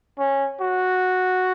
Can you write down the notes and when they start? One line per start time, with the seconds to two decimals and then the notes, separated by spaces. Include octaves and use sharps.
0.19 C#4
0.61 F#4